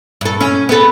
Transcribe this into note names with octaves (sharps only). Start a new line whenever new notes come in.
G2 A4
C#4
B3 A4